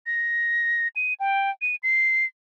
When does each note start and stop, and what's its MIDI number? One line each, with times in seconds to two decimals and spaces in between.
0.06 0.88 94
0.96 1.14 99
1.20 1.51 79
1.62 1.76 99
1.83 2.25 96